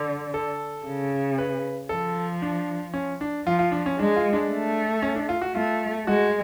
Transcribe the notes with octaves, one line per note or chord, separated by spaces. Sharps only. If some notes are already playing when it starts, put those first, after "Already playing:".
Already playing: D3
A4
C#3
B4
F3 A4
D4
C#4
D4
F3 F4
F4
D4
C#4
G#3 D4
F4
D4
A3
C#4
D4
F4
F#4
A3 F4
G#3 F#4